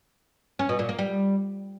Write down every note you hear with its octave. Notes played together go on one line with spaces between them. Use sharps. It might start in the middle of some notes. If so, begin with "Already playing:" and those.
C#4
B2
A#2
A#3
G3